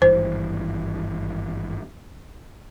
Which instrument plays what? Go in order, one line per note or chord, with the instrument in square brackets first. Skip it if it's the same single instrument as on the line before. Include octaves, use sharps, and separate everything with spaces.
[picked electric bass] G#1 G2 E3 [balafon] C5